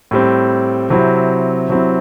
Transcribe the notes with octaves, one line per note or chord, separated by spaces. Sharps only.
A2 G3 C4
C3 F#3 C4 E4
C3 F#3 C4 E4